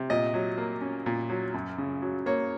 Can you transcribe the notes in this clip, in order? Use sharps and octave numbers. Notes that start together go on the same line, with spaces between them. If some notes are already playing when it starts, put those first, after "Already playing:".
Already playing: C3
A#2 D#5
F#3
A#3
C#4
A#2
F#3
F#2
C#3
F#3
A#3 C#5